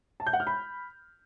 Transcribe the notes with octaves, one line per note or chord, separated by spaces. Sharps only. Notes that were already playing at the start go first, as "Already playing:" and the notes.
A5
G6
F#5
F6
B5